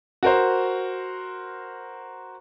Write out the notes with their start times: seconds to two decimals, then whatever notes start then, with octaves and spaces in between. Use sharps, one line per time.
0.23 F#4 A#4 C5